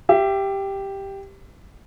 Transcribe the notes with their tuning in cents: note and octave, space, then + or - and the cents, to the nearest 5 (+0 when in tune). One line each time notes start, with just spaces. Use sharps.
G4 +0 E5 +30